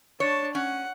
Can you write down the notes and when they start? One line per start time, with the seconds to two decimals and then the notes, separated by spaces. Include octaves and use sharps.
0.20 D4 C#5 A5
0.55 C#4 F#5